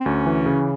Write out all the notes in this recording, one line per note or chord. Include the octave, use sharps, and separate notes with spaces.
C4
D2 C#4
E3
C#3